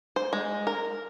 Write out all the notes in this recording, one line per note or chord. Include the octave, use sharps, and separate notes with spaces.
C5
G#3
A#4